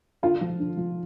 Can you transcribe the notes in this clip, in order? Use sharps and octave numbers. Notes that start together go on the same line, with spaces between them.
D3 F4
F3
D3
F3